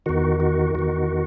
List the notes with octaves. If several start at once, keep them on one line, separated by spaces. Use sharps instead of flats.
E2 D#3 F#4
F#4
E2 D#3 F#4